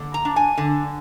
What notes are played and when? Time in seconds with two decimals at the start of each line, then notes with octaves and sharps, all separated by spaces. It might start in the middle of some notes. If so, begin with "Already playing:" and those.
Already playing: D3 A#3
0.14 A#5
0.25 D4
0.36 G#5
0.58 D3